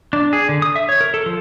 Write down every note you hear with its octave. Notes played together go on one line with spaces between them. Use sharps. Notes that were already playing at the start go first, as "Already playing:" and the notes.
D4
G#4
D3
D#6
E5
C#5
A#4
A4
F3